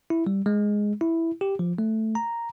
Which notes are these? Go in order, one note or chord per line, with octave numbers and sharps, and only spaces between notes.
E4
G3
G#3
E4
G4
F3
A3
A#5